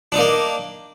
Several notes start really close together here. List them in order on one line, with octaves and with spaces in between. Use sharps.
D4 D#4 A#3